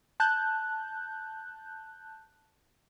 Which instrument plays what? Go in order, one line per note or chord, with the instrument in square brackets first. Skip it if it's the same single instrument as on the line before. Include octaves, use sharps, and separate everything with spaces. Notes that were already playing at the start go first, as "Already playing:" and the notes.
[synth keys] A5 F#6 G6